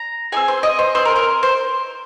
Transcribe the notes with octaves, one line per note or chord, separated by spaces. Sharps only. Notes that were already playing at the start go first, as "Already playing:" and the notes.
Already playing: A#5
C4 D#4 G#4 G#5
C5
D#5
C5
C4 G#4 C5
A#4
A#4
C5